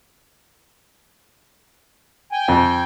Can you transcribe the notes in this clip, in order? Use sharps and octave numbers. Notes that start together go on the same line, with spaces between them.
G5 G#5
F2